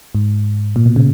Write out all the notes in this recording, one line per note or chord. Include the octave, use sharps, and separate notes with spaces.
G#2
A#2
B2
C#3